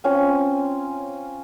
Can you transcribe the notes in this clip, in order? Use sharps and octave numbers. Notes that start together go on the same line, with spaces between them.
C4 C#4 F4